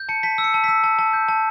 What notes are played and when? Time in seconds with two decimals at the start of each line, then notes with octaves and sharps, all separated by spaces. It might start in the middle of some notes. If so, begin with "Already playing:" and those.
Already playing: G6
0.09 A5 C#7
0.23 A5 B6
0.38 E6
0.44 C#7
0.54 A5
0.64 E6 B6
0.84 A5
0.99 A5
1.13 G6
1.28 A5